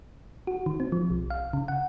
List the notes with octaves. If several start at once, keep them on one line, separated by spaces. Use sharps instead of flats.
F#4
D#3
C4
F3
B1
F5
C#3
F#5